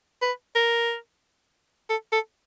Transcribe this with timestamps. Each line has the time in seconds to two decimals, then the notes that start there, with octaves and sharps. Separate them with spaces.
0.21 B4
0.55 A#4
1.89 A4
2.12 A4